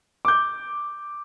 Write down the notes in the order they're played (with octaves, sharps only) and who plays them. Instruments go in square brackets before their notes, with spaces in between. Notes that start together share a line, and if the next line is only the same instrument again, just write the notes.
[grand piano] D6 G6